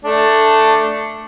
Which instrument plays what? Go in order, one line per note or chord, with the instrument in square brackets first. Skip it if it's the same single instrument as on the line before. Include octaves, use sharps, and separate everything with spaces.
[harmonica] A3 D4